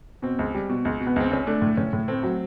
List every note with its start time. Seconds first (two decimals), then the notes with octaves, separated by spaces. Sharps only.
0.22 B2 C4
0.39 C#2
0.54 G3
0.69 B2
0.85 C#2
1.00 B2
1.07 B3
1.16 C#2 C4
1.31 C#2 C#4
1.47 A3 D4
1.62 A2
1.77 A2 C#4
1.93 A2
2.08 A3 C4
2.23 F#3